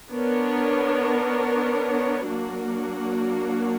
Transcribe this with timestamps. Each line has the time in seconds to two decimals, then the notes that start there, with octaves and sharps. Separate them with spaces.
0.11 B3 D4 A#4 C#5
2.29 F#3 A#3 D4 F#4